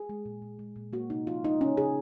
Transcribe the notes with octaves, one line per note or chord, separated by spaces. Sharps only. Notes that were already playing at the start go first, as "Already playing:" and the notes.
Already playing: G#4
G#3
A#2
A#2
G#3
A#2
A#3 F#4
C3 D#4
F3 F4
G#3 D#4
C#3 C#4
C#3 G#4